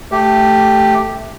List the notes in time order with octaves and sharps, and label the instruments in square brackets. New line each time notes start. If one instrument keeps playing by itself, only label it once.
[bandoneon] A3 G4